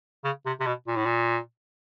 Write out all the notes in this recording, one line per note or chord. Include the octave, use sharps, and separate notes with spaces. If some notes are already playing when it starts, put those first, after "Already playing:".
C#3
C3
C3
B2
A#2
A2
A#2